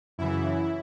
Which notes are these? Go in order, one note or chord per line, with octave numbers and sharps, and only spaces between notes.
F#2 C#3 E3 E4